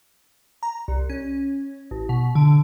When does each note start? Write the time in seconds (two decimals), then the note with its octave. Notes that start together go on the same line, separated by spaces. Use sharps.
0.63 A#5
0.88 C2
1.10 C#4
1.91 A1
2.09 B2
2.35 D3